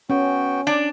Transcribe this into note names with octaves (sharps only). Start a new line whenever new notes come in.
B3 C#4 F#4 G5
D4 D5